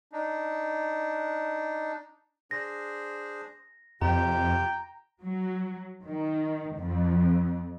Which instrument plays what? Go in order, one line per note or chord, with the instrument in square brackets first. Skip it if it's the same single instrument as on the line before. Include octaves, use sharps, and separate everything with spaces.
[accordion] D4 D#4
[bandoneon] D4 G#4 C5 [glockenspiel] A#6
[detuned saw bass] F2 [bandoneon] C3 F4 G4 [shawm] G5 [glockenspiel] A#5
[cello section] F#3
D#3
F2